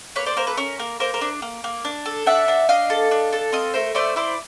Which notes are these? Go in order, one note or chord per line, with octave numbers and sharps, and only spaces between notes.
A#3 B4 C#5
C5 D5
A#3 A#4 C5
A4 B4
C#4 A#4
A#3 A#4
A#3 A#4 C5
A#4 C5
D4
A#3
A#3
D4
A4
D4 E5 F#5
D4
D4 D#5 F5
A4
D4
A4
C4 D#5 F5
A3 A#4 C5
A3 C5 D5
E4 C5 D5